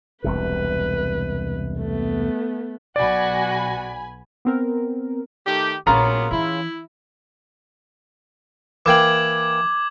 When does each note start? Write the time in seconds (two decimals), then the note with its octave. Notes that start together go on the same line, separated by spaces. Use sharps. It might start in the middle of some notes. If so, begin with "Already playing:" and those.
0.24 E1 C2 C3 B4
1.79 A3 B3
2.96 B1 F#4 D5 G#5 B5
4.45 B3 C4 A#4
5.47 D#3 A3 G4
5.87 A#1 F#3 A#3 B3 C#4 F4 G#4 A#5
6.31 E3 E4
8.86 E3 A#3 G5 D6 G#6 F#7